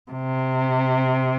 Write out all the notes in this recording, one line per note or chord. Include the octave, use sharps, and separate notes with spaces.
C3